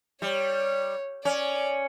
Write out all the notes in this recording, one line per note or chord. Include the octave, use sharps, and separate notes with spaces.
G3 C#5
C#4 D5